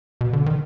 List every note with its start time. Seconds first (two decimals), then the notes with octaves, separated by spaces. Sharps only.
0.21 B2
0.33 D3
0.46 D#3